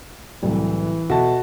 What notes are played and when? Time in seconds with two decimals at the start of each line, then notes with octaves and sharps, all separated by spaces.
0.43 C2 A2 E3 F#3
1.10 B2 F#4 A4 E5 A5